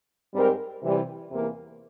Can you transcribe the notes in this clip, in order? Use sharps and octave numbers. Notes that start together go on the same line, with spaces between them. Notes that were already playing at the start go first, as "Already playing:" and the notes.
G#2 G3 C4 G4 A#4
C3 E3 G3
E2 C3 E3 A#3